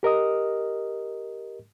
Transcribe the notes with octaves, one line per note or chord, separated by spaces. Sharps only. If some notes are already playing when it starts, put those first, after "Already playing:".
G4 A#4 D#5 D#6